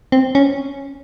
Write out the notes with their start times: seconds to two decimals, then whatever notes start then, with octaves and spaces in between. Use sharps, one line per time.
0.12 C4
0.35 C#4